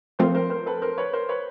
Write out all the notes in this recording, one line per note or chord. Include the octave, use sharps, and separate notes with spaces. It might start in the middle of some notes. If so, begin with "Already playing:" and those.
F3 A3 C4 F4 A#4 C5
A#4 C5
A#4 C5
A4 B4
A#4 C5
B4 C#5
A#4 C5
B4 C#5